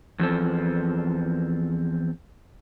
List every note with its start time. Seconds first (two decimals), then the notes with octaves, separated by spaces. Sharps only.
0.19 E2 F3 C4 A4